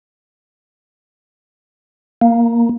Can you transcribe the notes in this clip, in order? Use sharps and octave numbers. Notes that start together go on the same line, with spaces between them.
A#3